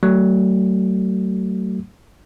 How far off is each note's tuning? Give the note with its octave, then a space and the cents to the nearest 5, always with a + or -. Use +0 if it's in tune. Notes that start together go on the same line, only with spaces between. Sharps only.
F#3 +40 A3 +30